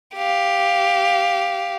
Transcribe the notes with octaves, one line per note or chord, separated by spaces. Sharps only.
G4 F5